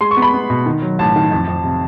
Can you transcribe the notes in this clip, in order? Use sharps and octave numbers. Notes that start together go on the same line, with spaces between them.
G#3 C6
C#6
B3
B5
B3
B2
D#3
F#3
A1 A5
D#3
F2
F2
C3